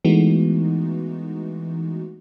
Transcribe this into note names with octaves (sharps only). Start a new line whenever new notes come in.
E3 G#3 A3 B3 D#4 F#4